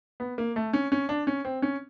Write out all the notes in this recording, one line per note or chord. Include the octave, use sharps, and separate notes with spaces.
B3
A#3
A3
C#4
C#4
D4
C#4
C4
C#4